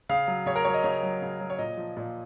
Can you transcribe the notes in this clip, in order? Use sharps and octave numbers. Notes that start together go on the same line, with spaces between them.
C#3 F5
F#3
C#3 C#5
A#4
F#3 C#5
D#5
C#3 C#5
F#3
C#3
F#3
C#5
A#2 D#5
F3
A#2